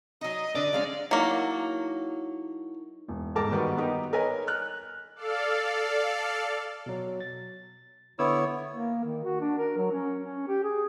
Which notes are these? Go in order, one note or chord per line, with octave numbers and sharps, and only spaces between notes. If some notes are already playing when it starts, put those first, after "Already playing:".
F#3 D#4 D#5
D3 D4 D5
F#3 G#3 C#4 F5
F#3 A#3 D#4 E4 C#6
E1
G1 G#2 A#4 A5 D6
D#3 G3 B3 D#4 F#4
G3 B3 D#4 G4
A#4 B4 C#5 D#5 G#5
F6 F#6
A4 D5 F5
B2 F#3
A6
D3 B3 E4 C#5 D6 E6
A#3
D#3
F#4
D4
A#4
F#3
C#4
C#4
G4
G#4